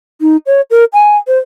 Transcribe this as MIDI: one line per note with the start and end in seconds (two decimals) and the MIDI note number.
0.21 0.37 63
0.46 0.61 73
0.71 0.84 70
0.93 1.17 80
1.28 1.38 72